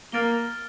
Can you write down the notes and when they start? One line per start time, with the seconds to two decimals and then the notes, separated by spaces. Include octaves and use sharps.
0.12 A#3 F6 A6 D7 G7